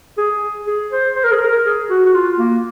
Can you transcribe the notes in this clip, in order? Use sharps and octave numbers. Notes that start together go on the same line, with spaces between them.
G#4
G#4
C5
C5
A#4
G#4
A#4
G#4
F#4
F#4
F4
A#3